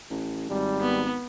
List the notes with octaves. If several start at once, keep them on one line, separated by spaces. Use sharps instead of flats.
A1
G#1 G3
B3